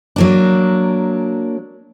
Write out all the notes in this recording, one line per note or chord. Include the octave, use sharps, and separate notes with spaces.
F#3 A#3 D4